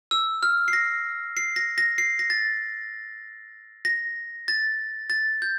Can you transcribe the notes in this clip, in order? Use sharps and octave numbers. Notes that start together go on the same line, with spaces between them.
E6
F6
C7
A#6
C7
A#6
A#6
C7
A#6
A6
A#6
A6
A6
G6